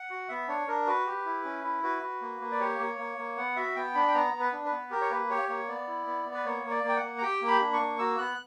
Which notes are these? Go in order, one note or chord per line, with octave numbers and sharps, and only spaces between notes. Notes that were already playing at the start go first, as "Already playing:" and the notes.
Already playing: F#5
F#4
B3 E5
D4 C#5
D4 A#4
F#4 B4
G4
E4
C#4
E4
F#4 B4
F#4
A#3
A#3
D5
G4 C#5
A#3
A#3
A#3
B3 F#5
F#4 E5
B3 G5
D4 B5
G5
B3 A#5
B3
B4
D4
B4
B3
G4 A#4
C#5
A#3 B4
G4 C#5
A#3 C#5
B3 D5
E4
B3
B3
B4
A#3 C#5
A#3
D5
A#3
G5
F#5
A#3
A#5
G4 G5
A#3
B5
D4
C#6
A#3
F#4 E6
B3 F#6